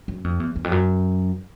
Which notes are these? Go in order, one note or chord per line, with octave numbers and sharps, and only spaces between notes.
F#2
F2
E2
E2
F2
F#2